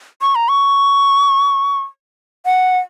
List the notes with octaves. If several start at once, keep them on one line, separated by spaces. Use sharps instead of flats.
C#6
A#5
C#6
F#5